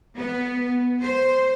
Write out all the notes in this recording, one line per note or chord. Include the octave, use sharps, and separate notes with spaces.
B3
C5